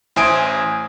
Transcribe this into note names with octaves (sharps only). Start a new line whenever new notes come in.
A1 E4 C5 G#5 D#6 D7